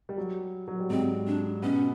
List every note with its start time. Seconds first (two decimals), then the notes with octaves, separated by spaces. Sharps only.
0.09 G3
0.18 F#3
0.68 F#3
0.79 G3
0.90 G#2 G#3 C4
1.27 D4
1.63 B2 B3 C#4